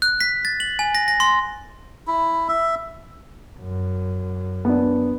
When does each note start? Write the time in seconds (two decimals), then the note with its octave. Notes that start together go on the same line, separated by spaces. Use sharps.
0.02 F#6
0.21 B6
0.45 A6
0.60 F#7
0.79 G#5
0.95 A#6
1.08 A#6
1.20 C6
2.07 E4
2.48 E5
3.59 F#2
4.65 B3 D4